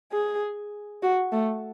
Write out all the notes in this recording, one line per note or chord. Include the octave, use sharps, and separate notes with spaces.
G#4
F#4
A3